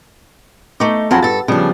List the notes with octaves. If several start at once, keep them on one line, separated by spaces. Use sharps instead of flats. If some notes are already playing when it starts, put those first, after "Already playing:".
A3 D#4 C#6 D6
F2 F#3 F4 G#4 A5 B5
G2 A4 A6
C#3 F3 G3 B3 D4